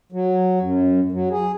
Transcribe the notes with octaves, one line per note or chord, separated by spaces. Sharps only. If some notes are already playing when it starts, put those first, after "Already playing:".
F#3
F#2
F#3
G#4